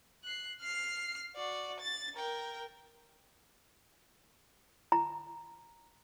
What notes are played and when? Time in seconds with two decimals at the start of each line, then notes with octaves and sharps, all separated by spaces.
0.24 F#6 C7
0.61 F6 C7
1.35 F#4 D5
1.81 A6
2.15 A#4 G5
4.92 A#5